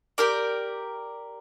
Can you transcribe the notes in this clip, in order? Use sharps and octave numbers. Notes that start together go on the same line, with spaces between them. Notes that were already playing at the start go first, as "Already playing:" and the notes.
G4 A#4 D5